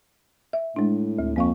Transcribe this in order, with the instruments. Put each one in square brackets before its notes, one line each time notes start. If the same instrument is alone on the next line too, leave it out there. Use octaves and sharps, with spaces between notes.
[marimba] E5
[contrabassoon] A2 [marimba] G#3 D4
[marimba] D2
[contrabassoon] F2 [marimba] A#3 F5 C#6